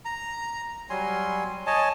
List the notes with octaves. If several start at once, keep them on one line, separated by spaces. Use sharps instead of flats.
A#5
F#3 G3 G#5 C6
C#5 D#5 G#5 A5